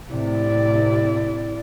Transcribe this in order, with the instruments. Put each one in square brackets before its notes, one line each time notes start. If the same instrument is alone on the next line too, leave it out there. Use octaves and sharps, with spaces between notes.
[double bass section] A2 C3 [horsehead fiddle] E4 D5